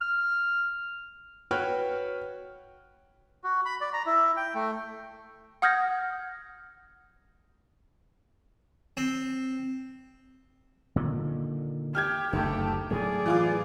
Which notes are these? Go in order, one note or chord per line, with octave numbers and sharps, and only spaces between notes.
F6
F#4 B4 C#5 G5 F6
F#4
B5
D5
A#5
E4
G5
A3
F#5 D#6 F6 G6 G#6 A#6
C4
A#2 D3 D#3
G4 F6 G6 G#6
F#1 D2 A3 D#4 G4
A2 F#3 A3 G#4 D5
E3 F4 D6